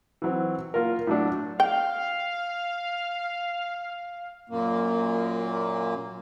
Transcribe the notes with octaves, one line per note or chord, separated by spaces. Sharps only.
E3 F#3 C4
A#3 F4 A#4
A2 F#3 D4
F5 G5
F#2 A#2 A#3